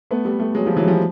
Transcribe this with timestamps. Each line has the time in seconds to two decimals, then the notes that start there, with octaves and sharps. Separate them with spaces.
0.11 A3 B3
0.25 G3 A3
0.40 G3 A3
0.55 F#3 G#3
0.65 F3 G3
0.77 E3 F#3
0.84 G#3
0.88 F3 G3